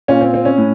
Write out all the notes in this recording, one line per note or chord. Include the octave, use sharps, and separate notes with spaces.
A#2 C#4
C4
C4
C#4
A2